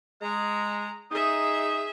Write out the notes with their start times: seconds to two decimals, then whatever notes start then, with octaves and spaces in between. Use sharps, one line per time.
0.22 G#3 A#5
1.12 D#4 G#4 E5 D#6